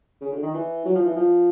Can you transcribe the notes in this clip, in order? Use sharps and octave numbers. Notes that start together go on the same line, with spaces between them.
C#3
D3
D#3
E3
F#3
F3
E3
F3